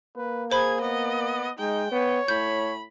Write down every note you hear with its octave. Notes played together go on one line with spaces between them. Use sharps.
A#3 B4
G#4 C5 B5 G#6
B3 D#5
G#3 D#4 G5
B3 C#5
A2 B5 G6